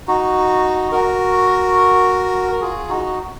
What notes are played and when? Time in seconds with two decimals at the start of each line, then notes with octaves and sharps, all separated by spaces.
0.08 D#4 F#4
0.92 F#4 A#4
2.52 A#4
2.61 F4 G#4
2.89 D#4 F#4